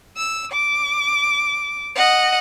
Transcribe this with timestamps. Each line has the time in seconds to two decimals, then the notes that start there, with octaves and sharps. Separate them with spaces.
0.17 E6
0.52 D6
1.95 D#5 F#5